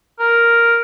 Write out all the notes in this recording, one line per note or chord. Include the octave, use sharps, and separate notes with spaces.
A#4